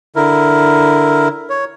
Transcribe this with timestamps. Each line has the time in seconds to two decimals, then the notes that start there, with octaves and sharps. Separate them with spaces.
0.16 D3 E4 A#4
1.50 C#5